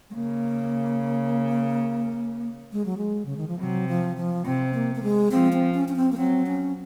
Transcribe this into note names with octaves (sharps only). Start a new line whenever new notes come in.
G#3
C#3 A#3
G#3
F#3
G#3
C#3
D#3
F3
C3 F#3
F3
F3
C3 C4
A#3
A#3
G#3
F3 C4
C4
C#4
C#4
C4
A#3
F#3 C4
C#4